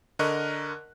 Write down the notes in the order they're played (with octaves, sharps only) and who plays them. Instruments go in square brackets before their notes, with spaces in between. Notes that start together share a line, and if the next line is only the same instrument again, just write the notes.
[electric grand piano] D3 A#4 D#5 C#6 F#6